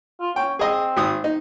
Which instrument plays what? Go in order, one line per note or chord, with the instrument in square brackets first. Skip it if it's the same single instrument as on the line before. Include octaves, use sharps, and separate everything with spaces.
[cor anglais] F4
[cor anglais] C#4 [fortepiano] G5
[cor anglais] C4 [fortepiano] G#4 D#5
[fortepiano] G#1 D#6
D#4